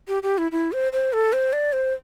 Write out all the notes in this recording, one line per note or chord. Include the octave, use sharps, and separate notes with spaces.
G4
G4
E4
E4
C5
C5
A4
C5
D5
C5